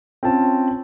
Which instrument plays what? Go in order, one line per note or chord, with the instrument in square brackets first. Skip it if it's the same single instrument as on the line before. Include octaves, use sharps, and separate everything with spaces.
[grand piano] C4 C#4 F4 A5